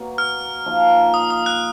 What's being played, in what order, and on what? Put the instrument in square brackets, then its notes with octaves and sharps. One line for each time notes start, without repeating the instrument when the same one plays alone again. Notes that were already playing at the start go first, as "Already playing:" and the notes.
Already playing: [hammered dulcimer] B2 F#3 A#3
[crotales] F6
[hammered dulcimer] F3 A#3 D#4
[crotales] D#6
D#6
F#6